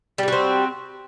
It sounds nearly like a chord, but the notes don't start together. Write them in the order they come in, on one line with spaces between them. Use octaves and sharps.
G3 G4 F#4 C4